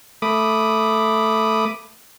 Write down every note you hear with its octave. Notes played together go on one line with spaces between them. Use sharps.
A3 B5 D6 D#6